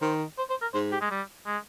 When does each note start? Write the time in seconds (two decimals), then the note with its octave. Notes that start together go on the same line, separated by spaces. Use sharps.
0.01 D#3 C5
0.38 C5
0.50 C5
0.62 A#4
0.74 G#2 C5
0.92 G4
1.01 G#3
1.11 G3
1.47 G#3